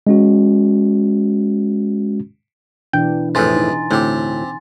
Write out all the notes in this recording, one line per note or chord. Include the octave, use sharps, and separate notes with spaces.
G#3 C#4 F#4
B2 E3 D4 G5
F2 A2 C3 G#4 B4 G#5 C6 A6
D#4
D2 A2 C4 G4